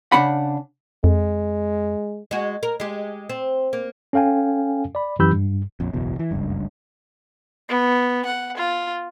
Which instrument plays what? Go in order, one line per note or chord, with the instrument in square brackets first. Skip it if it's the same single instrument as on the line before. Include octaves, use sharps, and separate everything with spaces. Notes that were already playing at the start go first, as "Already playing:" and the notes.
[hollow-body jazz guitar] C#3 D4 F#5 B5
[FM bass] F2 [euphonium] G#3
[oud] G#3 F#4
A#4
G#3 G4
C4
A#3
[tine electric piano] C#4 A4 F5 G5 G#5
D5 B5
F#2 E3 G4 B5 E6 G6
G2
[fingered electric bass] A#1 F2
F#1 B1 E2 B2
E3
F#1 C#2 G2
[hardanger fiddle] B3
F#5
F4